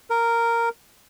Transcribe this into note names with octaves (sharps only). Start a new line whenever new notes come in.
A#4